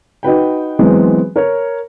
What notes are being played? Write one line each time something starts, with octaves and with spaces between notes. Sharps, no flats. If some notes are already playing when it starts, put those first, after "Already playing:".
D#4 F#4 B4 G5
E3 F#3 G#3 B3 C4
A#4 C#5